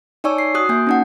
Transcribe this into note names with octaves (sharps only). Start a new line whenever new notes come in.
D#4 C#5 D5 G#5 C#6 E6
C7
F#4 D#6 F#6
A#3 G#5 G6
C#4 D#4 F#5